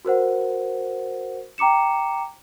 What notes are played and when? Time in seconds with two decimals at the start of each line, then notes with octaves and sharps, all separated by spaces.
0.05 F#4 A#4 C5 F#5
1.58 G5 A#5 D6 C#7 E7